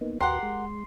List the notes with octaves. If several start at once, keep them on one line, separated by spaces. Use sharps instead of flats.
A#3 B3 D#4
D#2 F#4 G4 A#4 B4 F#5 C6
G#3